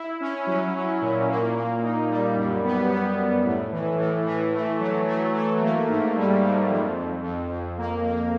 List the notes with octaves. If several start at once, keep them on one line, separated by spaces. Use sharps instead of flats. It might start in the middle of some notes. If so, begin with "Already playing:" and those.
Already playing: E4
C#4
F#3
C#4
A#2
A#3
A#3
D#4
G3
F#2
B3
B3
F#2
A2
E3
A2
E3
A3
F#3
A3
A3
A#3
G#2
G3
G#2
F2
F2
F2
F2
A#3
A#3